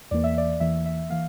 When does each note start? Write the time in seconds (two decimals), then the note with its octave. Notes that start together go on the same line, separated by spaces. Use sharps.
0.11 E2 E3 A#3 D5
0.24 E5
0.38 D5
0.60 E2 E3 A#3 E5
0.86 E5
1.10 E3 A#3 F5